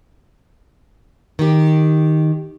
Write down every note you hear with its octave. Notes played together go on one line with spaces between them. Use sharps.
D#3 G4